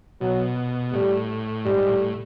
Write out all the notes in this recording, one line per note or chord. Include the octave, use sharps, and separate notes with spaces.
B2 F#3
A2 G3
G#2 G3
A2